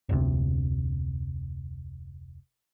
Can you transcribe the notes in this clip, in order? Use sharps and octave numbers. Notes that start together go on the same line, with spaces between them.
F1 D2 C3